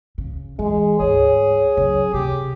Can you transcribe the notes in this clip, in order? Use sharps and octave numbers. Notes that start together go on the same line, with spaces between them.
C#3
E3 G#3
D2 G#2 G#4 C#5
C#3 F#3
C3 G4